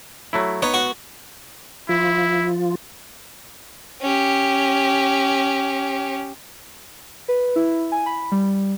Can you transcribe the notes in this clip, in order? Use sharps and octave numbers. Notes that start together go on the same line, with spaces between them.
F#3 A3 E4
B3 D#4 C#5
F#4 C#6
F3 E4 F4
C#4 G4
B4
E4
G#5
B5
G3